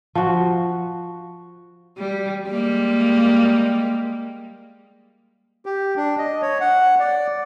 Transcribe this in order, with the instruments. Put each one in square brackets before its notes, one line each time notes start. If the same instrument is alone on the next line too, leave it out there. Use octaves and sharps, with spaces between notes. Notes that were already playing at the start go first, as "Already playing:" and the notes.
[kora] F3 F#4
[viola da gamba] G3
G3 G#3 A#3
[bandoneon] G4
D4
D#5
C#5
F#5
D5